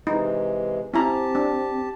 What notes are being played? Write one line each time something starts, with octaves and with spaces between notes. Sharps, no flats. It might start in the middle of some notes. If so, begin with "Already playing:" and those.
C3 E3 G#3 D#4
C4 C#4 E4 G4 A5 A#5
D4